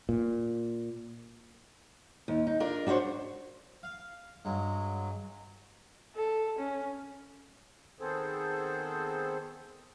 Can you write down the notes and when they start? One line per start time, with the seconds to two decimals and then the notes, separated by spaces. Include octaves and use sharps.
0.09 A#2
2.28 D#2
2.47 D#4
2.60 D4 F4 A#4
2.87 D4 F#4 A4 C5 C#5
3.83 F5
4.45 G2 F#3 G#3
6.16 A4
6.59 C#4
8.00 D#3 B3 C4 G#4 A4 C5